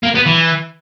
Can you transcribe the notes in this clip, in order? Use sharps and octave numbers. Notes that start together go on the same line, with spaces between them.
A#3
B3
E3